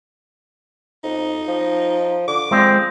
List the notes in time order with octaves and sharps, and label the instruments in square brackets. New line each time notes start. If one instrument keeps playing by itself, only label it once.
[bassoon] F2 [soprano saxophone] D#4
[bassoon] F3
[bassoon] D3 [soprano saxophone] D6
[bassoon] F3 [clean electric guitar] G#3 C4